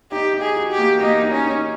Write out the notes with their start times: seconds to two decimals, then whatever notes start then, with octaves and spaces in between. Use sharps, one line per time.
0.12 D#4 G4
0.34 D#4
0.42 G#4
0.56 F#4
0.71 G4
0.78 A#3
1.00 A#3 D#4
1.23 D#4
1.31 C#4
1.45 D#4